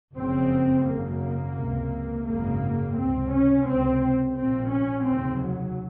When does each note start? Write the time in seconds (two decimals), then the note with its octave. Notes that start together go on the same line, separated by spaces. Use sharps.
0.16 F#1 F2 C#3 C4
0.86 G#1 F#2 C#3 A#3
1.56 C#2 C3
2.26 G#1 F#2 C#3 A#3
2.96 C#2 C3 C4
3.31 C#4
3.65 C#2 C3 C4
4.36 A#1 A#2 C4
4.71 C#4
5.05 F1 D#2 C#3 C4
5.40 F#3